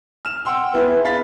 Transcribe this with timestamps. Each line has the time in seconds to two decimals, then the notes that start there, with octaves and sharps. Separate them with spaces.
0.25 F6 E7
0.45 F#5 G5 C6 E6
0.73 B3 E4 G#4 B4
1.05 F5 B5 A6 B6